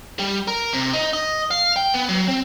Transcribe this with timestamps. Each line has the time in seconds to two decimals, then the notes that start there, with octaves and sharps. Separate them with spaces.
0.19 G3
0.48 A#4
0.73 C3
0.93 D#4
1.13 D#5
1.51 F5
1.76 G5
1.94 B3
2.09 F#3
2.28 C4